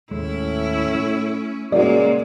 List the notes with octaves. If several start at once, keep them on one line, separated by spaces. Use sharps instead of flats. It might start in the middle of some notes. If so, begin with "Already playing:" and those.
D#2 A2 G#3 C#4 E4
A3
A#2 C#3 G3 G#3 F#4 A#4 D5